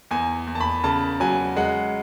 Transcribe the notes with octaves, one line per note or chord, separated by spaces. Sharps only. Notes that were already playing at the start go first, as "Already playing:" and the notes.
E2 G#5
E2
A5
B5
C#3 A5
F#3 G#5
G#3 F#5